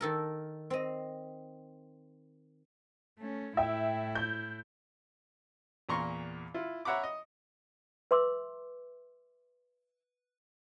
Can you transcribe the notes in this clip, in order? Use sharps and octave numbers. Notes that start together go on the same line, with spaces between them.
D#3 A4 A#4
C4 D#5
A3 C#4
A2 E4 E5 G5
G6
E2 A#2 A#5 C6 C#6
E4 F4
C#5 E5 F#5 A#5 B5 D6
D#5
B4 E5 C6 D6 E6